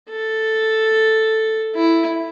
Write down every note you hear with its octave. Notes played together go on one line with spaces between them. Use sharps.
A4
E4